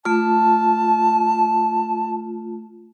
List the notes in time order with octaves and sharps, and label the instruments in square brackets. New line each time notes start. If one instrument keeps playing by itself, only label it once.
[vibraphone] A3 F4 [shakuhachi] A5